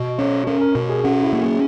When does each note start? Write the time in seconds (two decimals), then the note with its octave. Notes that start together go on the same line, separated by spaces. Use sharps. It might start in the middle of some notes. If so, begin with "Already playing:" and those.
Already playing: B2 D#5
0.18 C#4 C#5
0.47 C#4 A#4
0.61 A#4
0.75 B2 A#4
0.89 G#4
1.04 C#4 F#4
1.23 E4
1.33 A#3
1.42 G#4